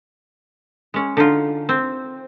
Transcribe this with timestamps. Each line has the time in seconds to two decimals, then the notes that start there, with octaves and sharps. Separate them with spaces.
0.94 G#3 C#4
1.17 D3 D#4 F4
1.69 C4